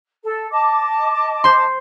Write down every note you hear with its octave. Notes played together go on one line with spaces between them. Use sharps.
A4
D#5 A5 D6
C5 C6